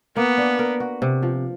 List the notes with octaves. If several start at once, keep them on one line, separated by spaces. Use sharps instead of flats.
A#3 B3
D4
A#4
F#4
C3
F3